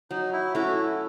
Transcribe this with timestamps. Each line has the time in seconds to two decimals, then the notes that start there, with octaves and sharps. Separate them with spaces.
0.11 F#3 D#4
0.33 E4
0.55 A3 C#4 E4 F#4